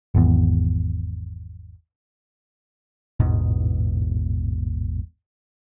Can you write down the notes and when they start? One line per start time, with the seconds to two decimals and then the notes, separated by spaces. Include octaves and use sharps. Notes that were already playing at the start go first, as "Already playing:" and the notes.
0.15 G#1 E2
3.20 A1 E2 G#2 B2